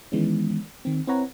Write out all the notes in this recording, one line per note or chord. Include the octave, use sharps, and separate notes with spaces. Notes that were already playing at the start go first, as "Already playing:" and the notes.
D#3 E3 G#3 B3 C#4
D#3 C4
C4 E4 B4 C#5 F#5 A#5